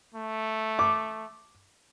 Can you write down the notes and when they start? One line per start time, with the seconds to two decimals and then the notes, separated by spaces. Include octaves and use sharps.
0.14 A3
0.79 D6